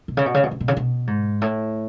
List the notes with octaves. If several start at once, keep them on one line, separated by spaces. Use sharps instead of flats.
B2
C#3
B2
C#3
B2
C#3
B2
C#3
B2
G#2
A2